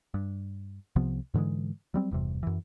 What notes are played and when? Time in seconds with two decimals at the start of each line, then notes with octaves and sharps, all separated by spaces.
0.14 G2
0.96 C2 C3 F3 B3
1.34 G#2 D3 E3 G#3
1.94 F#3 G3 C4
2.11 E1 E2 G2 C3
2.43 F#2 E3